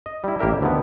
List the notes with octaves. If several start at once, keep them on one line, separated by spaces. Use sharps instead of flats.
D#5
G3 E4
A1 A#3 G4 A#4 E5
D2 D3 D#3 B3